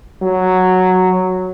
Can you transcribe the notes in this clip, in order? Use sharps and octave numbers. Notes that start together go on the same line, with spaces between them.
F#3